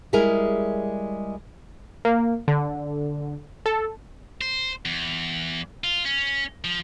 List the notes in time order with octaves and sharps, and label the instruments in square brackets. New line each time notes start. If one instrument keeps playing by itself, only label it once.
[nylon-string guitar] G3 G#3 E4 G#4 A#4
[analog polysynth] A#3
D3
A4
[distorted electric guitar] C5
E2
F4
C#4
F3